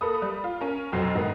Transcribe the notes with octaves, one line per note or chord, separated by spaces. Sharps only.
A#3 A4 B4 D#6
G3
F4
C#4 A#4
F1 B1 F2 F#3 C5 C7
G#2 D#3 B3